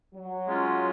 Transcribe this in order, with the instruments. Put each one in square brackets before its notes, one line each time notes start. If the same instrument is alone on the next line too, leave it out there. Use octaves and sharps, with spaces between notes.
[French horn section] F#3
[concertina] G#3 C#4 F4